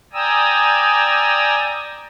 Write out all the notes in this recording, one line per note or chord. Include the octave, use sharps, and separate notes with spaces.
D5 G5 G#5 A#5 D#6 E6